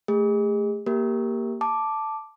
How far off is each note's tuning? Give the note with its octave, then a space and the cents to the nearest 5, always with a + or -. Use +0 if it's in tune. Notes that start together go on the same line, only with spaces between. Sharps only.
A3 +0 G#4 -40
A#3 +0 G4 +0 A#4 +0
A5 +0 D6 +0